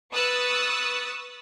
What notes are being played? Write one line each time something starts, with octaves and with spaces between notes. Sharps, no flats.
B4 C#6 D#6 E6 F#6 A6